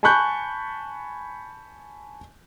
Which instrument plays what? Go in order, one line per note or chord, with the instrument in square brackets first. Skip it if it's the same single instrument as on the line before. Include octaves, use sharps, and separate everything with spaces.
[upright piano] G#5 A5 B5 C#6 F#6 G6